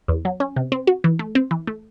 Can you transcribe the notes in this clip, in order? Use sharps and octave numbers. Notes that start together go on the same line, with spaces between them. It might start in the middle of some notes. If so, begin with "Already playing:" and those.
E2
F#3
C#4
C3
C4
F#4
E3
A3
C4
E3
A3